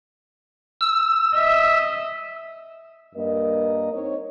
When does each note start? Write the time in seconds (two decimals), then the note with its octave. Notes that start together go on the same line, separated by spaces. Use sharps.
0.81 E6
1.37 D#5 E5
3.15 G2 A#3 A#4 D#5
3.93 C4 D#4 A#4 C#5